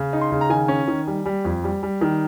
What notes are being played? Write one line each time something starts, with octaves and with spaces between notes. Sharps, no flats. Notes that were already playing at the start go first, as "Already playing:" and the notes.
Already playing: C#3
D#4
C6
C#3
A#5
D#3 G#5
C#4
D#3
G3
G3
F2
G3
G3
D#3